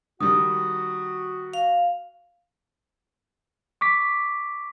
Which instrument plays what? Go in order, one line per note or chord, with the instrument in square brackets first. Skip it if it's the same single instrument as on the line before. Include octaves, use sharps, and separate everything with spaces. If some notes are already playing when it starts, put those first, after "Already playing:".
[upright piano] D#3 G3 [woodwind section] F#4 [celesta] D#6
[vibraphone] F5
[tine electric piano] C#6 D6 B6